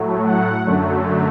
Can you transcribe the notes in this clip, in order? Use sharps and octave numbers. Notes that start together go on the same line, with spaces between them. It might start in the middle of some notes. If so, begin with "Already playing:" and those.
Already playing: A2 F#3 A3
F#5
F#2 D3 F#3 A3